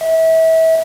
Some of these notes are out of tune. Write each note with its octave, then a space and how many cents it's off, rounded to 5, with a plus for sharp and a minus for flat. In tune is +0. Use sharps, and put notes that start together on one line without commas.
E5 -30